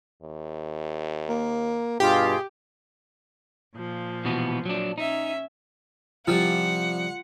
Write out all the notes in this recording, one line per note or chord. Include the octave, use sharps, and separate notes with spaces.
D#2
A#3
G2 B2 F4 G4 G#4 F5
A#2 F3
B2 E3 B3
F#3 D4
C#4 D#4 E5
C3 F3 G3 F4 F#5 F6 A6